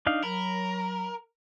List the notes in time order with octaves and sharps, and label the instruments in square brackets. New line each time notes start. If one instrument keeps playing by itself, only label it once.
[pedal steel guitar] D4 D#4 F5
[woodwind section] F#3 [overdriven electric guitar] A#4 [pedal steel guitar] B5